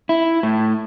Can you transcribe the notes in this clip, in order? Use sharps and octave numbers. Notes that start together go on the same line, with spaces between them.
E4
A2